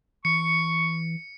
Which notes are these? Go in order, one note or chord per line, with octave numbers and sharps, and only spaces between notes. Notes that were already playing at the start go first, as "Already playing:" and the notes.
E3 C#6 C#7